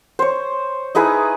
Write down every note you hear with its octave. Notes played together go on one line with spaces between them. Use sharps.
C5 C#5
D#4 E4 G#4 B4